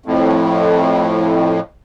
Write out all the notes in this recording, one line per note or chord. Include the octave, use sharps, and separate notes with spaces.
F2 A2